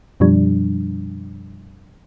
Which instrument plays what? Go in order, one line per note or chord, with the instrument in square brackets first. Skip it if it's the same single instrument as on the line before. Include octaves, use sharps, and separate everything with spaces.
[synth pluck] F#2 B2 F3 G3 D4